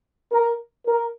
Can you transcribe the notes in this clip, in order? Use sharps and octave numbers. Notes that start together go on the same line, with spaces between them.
A#4
A#4